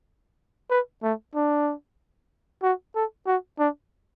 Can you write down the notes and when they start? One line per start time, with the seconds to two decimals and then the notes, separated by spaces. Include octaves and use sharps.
0.70 B4
1.03 A3
1.35 D4
2.63 F#4
2.96 A4
3.27 F#4
3.59 D4